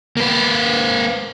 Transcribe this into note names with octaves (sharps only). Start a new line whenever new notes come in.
A#3 B4